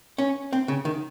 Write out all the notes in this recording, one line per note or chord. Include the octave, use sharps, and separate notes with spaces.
C#4
C4
C#3
D#3